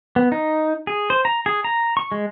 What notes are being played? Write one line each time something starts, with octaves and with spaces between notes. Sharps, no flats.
B3
D#4
G#4
C5
A#5
G#4
A#5
C#6
G#3